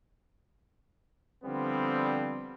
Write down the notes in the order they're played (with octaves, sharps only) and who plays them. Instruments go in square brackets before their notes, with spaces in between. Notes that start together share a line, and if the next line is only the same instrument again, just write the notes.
[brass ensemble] D3 F3 G3 B3 C4